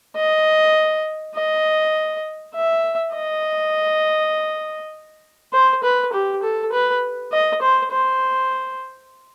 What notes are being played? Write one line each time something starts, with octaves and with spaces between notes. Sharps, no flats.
D#5
D#5
E5
D#5
C5
B4
G4
A4
B4
D#5
C5
C5